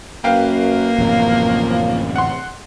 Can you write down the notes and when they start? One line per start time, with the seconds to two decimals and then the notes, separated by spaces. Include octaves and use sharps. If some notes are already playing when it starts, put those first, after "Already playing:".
0.24 F#2 A#3 B4 F5 G5
0.98 A1 F#2 C3 F3
2.16 F#5 C6